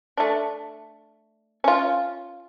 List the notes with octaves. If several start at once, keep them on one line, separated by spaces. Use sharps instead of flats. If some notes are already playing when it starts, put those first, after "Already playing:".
A3 D4
C#4 F4